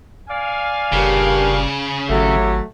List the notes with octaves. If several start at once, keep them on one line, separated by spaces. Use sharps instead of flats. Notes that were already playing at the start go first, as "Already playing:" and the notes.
D5 F5 G#5
F#1 G2 A#2 C#3
G#1 F#3 A3 E4 G4 C#5